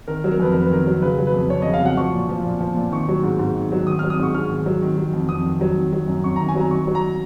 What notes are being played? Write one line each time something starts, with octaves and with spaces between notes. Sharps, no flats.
D#3 A#4
F#3
A#4
F2 B4
F2 A#4
B4
D#3 A#4
F#3
C#3 B4
F#3
B4
F2
F2 C#5
C#3 D#5
F5
F#3 F#5
F3 C#6
A#2
F3
A#2
F3
A#2
D#3 C#6
F#3
G#2
G#2
D#3
F#3
D#3 D#6
F#3 F6
D#6
G#2 C#6
G#2 F6
D#3
F#3
D#3
F#3
F2
F2 D#6
D#3
F#3
D#3
F#3
F#2
F#2 C#6
D#3 A#5
G#5
F#3 A#5
D#3 C#6
F#3
A#5